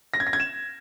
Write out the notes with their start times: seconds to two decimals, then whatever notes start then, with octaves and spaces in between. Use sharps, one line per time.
0.14 A#6
0.20 G#6
0.27 A#6
0.33 G#6
0.40 E7